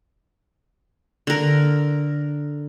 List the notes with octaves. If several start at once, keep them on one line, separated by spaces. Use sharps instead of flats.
D3 A#4